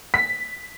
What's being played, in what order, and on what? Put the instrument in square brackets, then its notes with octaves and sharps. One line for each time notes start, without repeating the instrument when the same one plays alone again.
[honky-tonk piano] B6